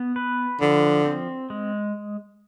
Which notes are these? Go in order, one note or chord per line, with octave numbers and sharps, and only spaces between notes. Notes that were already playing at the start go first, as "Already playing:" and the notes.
Already playing: B3
B4
D3 F3
C4
G#3